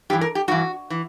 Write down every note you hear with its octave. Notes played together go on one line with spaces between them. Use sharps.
G2 E3 G4
A#4
G4
G2 E3 F#4
E3